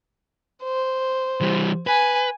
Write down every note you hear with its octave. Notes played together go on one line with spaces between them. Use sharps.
C5
E3 G3
B4 G#5